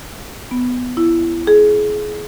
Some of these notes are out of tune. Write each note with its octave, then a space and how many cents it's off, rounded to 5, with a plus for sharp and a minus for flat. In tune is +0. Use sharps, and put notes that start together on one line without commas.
B3 +10
E4 +25
G#4 +25